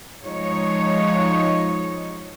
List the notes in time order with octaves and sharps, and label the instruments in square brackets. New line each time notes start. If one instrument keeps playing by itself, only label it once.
[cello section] F3 G#3 D#4 C#5